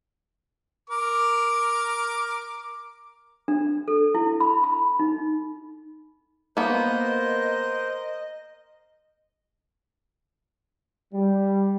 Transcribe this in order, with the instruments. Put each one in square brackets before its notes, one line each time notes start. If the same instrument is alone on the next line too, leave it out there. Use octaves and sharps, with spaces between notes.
[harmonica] A#4 D6
[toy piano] D4
A4
E4
B5
B5
D#4
[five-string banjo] A#3 B3 [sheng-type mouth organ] A#4 C5 [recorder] D#5
[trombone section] G3